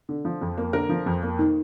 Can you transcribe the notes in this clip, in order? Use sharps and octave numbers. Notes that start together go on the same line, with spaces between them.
D3
F3
F2
A#3
D3 A#4
F3
F2
A#3
D#3